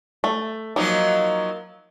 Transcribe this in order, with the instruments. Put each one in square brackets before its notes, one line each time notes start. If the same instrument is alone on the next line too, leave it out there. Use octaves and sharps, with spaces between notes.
[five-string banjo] A3
[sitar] F3 F#3 D#4 [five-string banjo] A#3